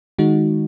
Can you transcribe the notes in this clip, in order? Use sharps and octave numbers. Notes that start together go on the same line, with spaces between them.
D#3 G#3 D#4 F#4